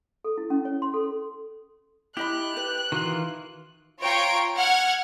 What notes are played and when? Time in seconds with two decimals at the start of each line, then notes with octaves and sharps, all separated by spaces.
0.24 A4
0.38 E4
0.50 C#4
0.65 C#5
0.82 C6
0.94 A4
2.17 E4 G4 D#5 B5 F#6
2.57 B4
2.92 D#3 E3 F4 F#4
4.01 F4 C#5 G5 A#5 D7
4.57 F#5 F6 G#6